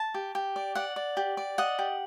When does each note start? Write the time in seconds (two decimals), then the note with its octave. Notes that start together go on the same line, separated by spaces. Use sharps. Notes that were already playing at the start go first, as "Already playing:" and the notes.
Already playing: A5
0.14 G4
0.35 G4
0.56 D5
0.75 D5 F#5
0.96 D5
1.17 G4
1.37 D5
1.58 D#5 F#5
1.79 G4